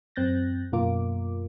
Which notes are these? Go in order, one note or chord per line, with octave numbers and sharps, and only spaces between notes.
F#2 C4 F#6 G6 A6 A#6
F#2 B2 A#3 F4 A#4 D6